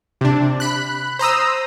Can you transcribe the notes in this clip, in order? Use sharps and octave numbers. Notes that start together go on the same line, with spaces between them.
C3 D4
B5 F#6
C5 A#5 D#6 E6